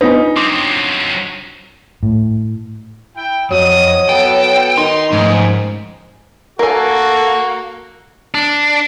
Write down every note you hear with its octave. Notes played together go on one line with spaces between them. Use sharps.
B3 D4 D#4 F4 B4 G#5
F#3 C4 C6 D6 D#6
A2
E4 G5
F2 F#3 D#5 D#6
B3 A4 G5
D#3 D#4 C6
G#2 F3 A3 B3 C#4 D#4 G#4
A#3 F#4 A4 A#4 G#5
D4